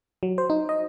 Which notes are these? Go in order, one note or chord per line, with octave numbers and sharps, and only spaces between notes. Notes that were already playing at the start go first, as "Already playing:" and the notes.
F#3
C5
D#4
D#5